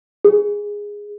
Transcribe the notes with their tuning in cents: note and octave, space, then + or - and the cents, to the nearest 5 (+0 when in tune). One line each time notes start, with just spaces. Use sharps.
G#4 -10